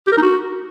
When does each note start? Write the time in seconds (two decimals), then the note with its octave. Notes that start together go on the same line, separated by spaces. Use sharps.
0.07 G4
0.12 A#4
0.17 D#4
0.22 F#4